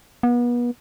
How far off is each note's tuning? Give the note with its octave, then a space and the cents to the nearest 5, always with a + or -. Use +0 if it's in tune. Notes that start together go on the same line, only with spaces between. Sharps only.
B3 -35